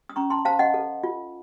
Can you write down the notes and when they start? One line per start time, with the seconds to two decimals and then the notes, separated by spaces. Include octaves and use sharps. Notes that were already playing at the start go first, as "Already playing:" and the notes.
0.09 D#6
0.16 C#4 A#5 C#6
0.30 A5 C6
0.45 C5 F5 A5
0.59 D#5 F#5
0.74 A4
1.04 F4